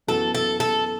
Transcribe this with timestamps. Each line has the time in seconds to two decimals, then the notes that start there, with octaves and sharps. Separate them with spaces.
0.07 F#2 E3 B3 F#4 A4
0.35 A4
0.60 A4